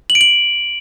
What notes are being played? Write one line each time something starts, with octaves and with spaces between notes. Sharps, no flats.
F#7
D7
F#7